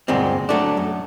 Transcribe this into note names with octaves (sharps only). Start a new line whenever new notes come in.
D2 G2 A#2 G#3 C4
F#3 A3 D4
F#2